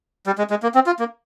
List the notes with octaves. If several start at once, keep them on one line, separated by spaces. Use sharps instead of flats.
G3
G#3
G#3
A#3
C4
F4
A#3